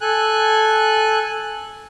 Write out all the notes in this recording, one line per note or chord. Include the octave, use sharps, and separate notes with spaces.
A4 G#5 F#6